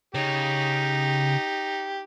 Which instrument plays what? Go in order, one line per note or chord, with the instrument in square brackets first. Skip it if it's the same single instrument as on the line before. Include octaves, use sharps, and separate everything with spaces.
[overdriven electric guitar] C#3 [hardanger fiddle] D#4 [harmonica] G4